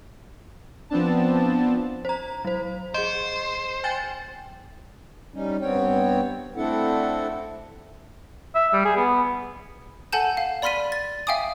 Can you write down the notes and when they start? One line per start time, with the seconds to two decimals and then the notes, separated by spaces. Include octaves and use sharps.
0.90 F3 B3 C4 D4 A5
2.05 C5 A#5
2.45 F#3 C5
2.94 G#4 C5 D#5
3.84 G5 G#5 A6
5.34 G3 C#4 D#4
5.62 G2 B3 C4 C#5 G5
6.56 A3 C4 D4 E4 A4 F#5
8.55 E5
8.74 G3
8.85 G#4
8.97 B3
10.13 A4 F#5 G#5 A5 G6 E7
10.37 F5
10.62 D5 B5 C6 F6 B6 D#7
10.92 A6
11.27 E5 F5 G5 G#5 D6 D#6